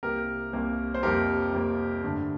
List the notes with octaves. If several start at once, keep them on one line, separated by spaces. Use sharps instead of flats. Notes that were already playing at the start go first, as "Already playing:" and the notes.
C2 C3 G3 A#3 G4 A#4
C2 C3 G3 A#3
C5
F2 C3 G3 A#3 G4 A#4
F2 C3 G3 A#3
G2 D3 A3